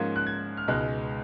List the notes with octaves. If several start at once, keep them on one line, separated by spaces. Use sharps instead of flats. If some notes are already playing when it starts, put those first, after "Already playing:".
Already playing: G#2 F3 A#3 C#4 G#6
F#6
G#6
F6
C#2 B2 G#3 D#4 F#6